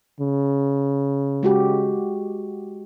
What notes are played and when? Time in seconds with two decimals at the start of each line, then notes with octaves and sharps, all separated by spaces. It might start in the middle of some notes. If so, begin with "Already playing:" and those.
0.21 C#3
1.43 G#3 F#4 G4